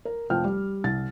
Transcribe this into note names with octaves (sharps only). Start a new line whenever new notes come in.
A#4
F1 F2 F3 G5 F6
G3
C2 A6